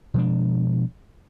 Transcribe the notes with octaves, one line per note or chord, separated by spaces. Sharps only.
B2 F3 G#3 D4